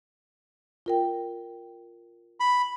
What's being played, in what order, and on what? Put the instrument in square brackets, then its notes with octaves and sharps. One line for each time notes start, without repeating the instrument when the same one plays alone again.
[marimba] F4 A#4 G5
[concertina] B5